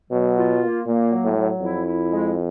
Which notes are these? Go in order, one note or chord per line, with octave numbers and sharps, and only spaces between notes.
B2 F#3
F4
A#3
A#2 A#3
F#3
A2
F#3
F2 E4
E4
G#3